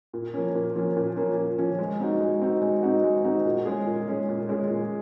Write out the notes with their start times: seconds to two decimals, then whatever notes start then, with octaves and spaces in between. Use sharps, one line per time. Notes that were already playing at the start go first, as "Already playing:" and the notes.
0.13 A#2
0.34 F3 A#3 C#4
0.55 A#2
0.76 F3 A#3 C#4
0.97 A#2
1.16 F3 A#3 C#4
1.37 A#2
1.58 F3 A#3 C#4
1.79 G#3
2.00 C4 D#4 F#4
2.21 G#3
2.42 C4 D#4 F#4
2.62 G#3
2.83 C4 D#4 F#4
3.03 G#3
3.25 C4 D#4 F#4
3.45 A#2
3.65 G#3 C#4 G#4
3.86 A#2
4.08 G#3 C#4 G#4
4.29 A#2
4.49 G#3 C#4 G#4
4.70 A#2